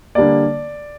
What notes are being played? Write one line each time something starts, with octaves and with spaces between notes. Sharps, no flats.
D3 G3 A#3 D5